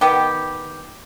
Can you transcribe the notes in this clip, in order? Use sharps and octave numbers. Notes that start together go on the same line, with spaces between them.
D#3 B3 G4